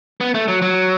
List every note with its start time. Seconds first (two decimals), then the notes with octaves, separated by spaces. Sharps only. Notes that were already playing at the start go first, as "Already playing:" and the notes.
0.21 B3
0.34 A3
0.48 F#3
0.62 F#3